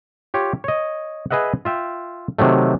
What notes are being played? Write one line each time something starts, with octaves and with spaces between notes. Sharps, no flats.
F4 G4 C#5
C#5 D#5
G#4 B4 D#5 E5 F#5
F4 E5 G5
C3 D#3 F#3 A3